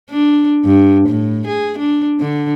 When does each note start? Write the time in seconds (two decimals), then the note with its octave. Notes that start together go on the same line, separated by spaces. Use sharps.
0.10 D4
0.65 G2
1.08 A2
1.47 G#4
1.78 D4
2.20 D3